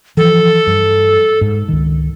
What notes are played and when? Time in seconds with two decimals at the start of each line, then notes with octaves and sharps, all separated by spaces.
0.17 E3 F3 A4
0.67 G2
1.41 G#2
1.68 C#2 D#3